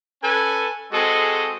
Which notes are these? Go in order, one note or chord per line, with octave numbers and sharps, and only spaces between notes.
C#4 A4 B4 G#5
G#3 C4 F#4 G#4 A4 D#5